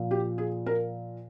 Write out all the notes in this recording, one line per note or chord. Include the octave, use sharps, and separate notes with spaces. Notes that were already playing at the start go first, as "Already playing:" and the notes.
Already playing: A#2 F3
G4
G#4
A#4